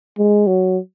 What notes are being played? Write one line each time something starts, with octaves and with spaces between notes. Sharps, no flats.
G#3
F#3